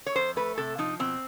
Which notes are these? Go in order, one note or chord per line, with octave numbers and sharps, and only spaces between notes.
C#5
F2 C5
A3 B4
C3 A4
F3 D#4
B2 C4